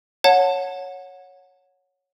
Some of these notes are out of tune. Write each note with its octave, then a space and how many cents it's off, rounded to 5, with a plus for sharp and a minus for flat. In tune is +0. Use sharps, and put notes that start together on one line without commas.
C#5 +0 F#5 -15 A5 +15